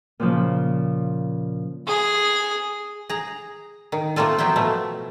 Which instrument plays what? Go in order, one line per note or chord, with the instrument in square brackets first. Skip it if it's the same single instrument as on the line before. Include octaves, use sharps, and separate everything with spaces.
[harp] A#2 C#3 F3
[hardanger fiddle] G#4
[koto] G#4 A#5
D#3
A3 A#3 C4 F4 A4
F#3 B3 C4 E4 G5
B2 F3 A3